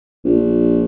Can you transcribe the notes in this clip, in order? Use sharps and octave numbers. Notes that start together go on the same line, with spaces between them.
A#1